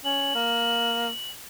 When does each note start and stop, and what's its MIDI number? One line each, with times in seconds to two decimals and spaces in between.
0.05 0.33 61
0.05 1.31 102
0.35 1.09 58